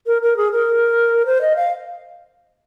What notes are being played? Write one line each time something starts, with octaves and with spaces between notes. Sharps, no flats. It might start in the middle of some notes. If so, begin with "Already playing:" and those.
A#4
A#4
G#4
A#4
C5
D#5
F5